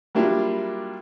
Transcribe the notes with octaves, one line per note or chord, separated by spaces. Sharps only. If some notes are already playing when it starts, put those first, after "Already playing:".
F#3 G3 A#3 D4 E4 F4